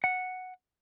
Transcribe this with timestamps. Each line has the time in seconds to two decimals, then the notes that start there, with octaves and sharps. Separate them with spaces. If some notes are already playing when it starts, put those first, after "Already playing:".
0.04 F#5